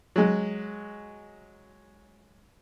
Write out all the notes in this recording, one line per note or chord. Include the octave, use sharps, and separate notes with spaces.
F#3 G#3